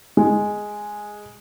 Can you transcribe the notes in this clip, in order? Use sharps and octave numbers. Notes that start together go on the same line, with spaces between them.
G#3